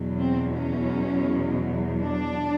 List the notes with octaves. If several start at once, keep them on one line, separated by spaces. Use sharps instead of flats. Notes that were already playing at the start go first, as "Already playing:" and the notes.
Already playing: E2 B2 F#3
C4
C#4
D4